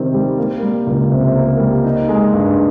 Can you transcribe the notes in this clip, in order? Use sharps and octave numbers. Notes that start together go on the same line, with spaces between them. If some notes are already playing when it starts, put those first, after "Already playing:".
Already playing: C3 D#3 G3 C4
G3
A#3
G3
C#2
C3
A#3
G3
D#4
G#3
G2